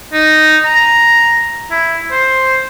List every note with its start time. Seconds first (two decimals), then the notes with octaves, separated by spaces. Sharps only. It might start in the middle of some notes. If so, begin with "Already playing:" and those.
0.13 D#4
0.65 A#5
1.71 E4
2.11 C5